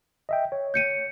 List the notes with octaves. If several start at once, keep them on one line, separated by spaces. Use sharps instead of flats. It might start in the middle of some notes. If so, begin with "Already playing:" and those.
D#5 E5 G5
C#5
G6 C#7 D#7